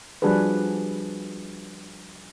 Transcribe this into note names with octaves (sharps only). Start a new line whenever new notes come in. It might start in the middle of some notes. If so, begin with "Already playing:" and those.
F3 G3 D4 F#4 G#4 B4